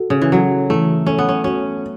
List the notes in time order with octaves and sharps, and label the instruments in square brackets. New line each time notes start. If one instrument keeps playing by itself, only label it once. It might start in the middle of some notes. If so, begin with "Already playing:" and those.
Already playing: [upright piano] F#4 A4
[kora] C#3
E3
[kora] F#3 [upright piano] A4
[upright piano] E3 [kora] A3
[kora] C#4 [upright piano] A4
[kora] B3
C#4
[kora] C#4 [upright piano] F#4